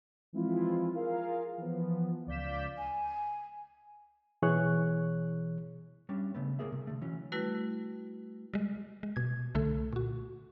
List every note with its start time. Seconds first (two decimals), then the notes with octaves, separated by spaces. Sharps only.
0.33 E3 F3 G#3 C4 E4 F4
0.94 F4 G#4 A#4 F5
1.58 E3 F3 B3
2.27 C#2 D5 F5 G6 B6 E7
2.78 G#5
4.42 B2 E3 G#4 C#5 C#6 F#6
6.09 G3 C#4 D4
6.34 C#3 A3 B3
6.59 C2 A2 D#3 A#3 G#4 E5
6.72 C3
6.87 D3 A3
7.02 E3 F#3 C#4
7.32 G3 A3 E4 F#4 B4
8.54 G3 G#3
9.03 G#3
9.16 B2 G#6
9.55 C2 D3 A3 A4
9.93 A#2 F#4